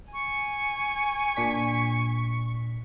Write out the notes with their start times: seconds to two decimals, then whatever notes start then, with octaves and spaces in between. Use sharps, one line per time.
0.13 G#5 C#6
1.37 A#2 D4 B6